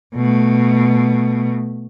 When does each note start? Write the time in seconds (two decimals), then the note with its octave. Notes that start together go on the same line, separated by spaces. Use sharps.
0.15 B2 A3